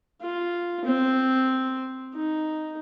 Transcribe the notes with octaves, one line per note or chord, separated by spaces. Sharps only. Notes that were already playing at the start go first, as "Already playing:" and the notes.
F4
C4
D#4